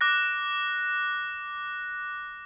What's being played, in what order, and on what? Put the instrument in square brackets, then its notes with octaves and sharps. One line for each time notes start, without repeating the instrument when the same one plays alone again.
[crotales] D6 F#6 A#6